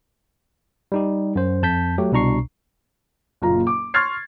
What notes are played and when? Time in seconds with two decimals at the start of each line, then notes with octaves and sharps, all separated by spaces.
0.92 G3 D#4 G4
1.35 F#2 C5
1.63 F2 A5 G6 B6
1.98 F#3 A3 G4
2.12 C2 B2 D4 A#5 C#6 C7
3.42 F#1 A#2 F4 A#5
3.67 D6
3.94 C6 C#6 F6 G#6 A6 C7